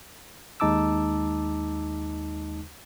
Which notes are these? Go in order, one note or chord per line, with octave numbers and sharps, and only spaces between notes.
D#2 G#3 D#4 A5 D6 E6